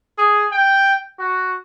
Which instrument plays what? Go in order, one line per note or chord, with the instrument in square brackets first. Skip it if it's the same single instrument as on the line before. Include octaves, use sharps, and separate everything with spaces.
[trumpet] G#4
G5
F#4